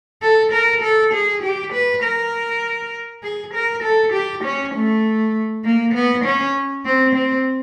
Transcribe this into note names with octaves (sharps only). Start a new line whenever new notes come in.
A4
A#4
A4
G#4
G4
B4
A#4
G#4
A#4
A4
G4
C#4
A3
A#3
B3
C#4
C4
C4